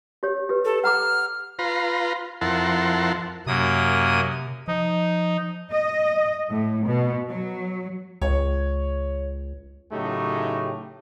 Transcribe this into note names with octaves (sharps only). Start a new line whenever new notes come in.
G4 C#5
G4 B4
A4
F#5 A#5 D6 F6
F4 B4 A#5 C6
F2 E4 A#4 F#5 A5 C6
F#2 C3 A#3 D#6
F3 D#4
D#5
A2
B2
F#3
C#2 C#5
A2 C#3 F#3 A3 D#4 G4